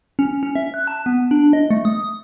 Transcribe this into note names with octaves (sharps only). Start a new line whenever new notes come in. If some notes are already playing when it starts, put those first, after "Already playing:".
C#4
C#4
E5
F#6
A5
B3
D4
D#5
A3
D#6